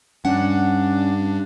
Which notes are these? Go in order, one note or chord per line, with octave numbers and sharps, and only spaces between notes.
G2 C#4 D4 F#5